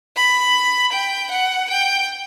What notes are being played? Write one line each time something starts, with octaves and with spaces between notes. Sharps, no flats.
B5
G5
F#5
G5